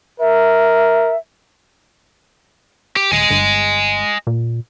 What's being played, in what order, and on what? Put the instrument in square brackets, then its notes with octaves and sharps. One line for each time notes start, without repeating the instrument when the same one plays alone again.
[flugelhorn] A#4 [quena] E5
[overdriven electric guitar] G4
[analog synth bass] D#1 [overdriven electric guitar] D#5 G#5
[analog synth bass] G1
A#2